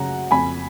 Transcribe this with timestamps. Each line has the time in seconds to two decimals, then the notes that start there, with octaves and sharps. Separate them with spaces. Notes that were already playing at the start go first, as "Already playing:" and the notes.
Already playing: F#2 C#3 F#5 A#5
0.31 F2 G#5 B5